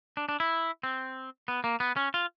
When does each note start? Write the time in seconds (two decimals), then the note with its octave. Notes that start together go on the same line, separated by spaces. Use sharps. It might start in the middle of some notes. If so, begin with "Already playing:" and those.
0.17 D4
0.29 D4
0.40 E4
0.83 C4
1.48 B3
1.64 A#3
1.80 B3
1.96 C#4
2.14 F4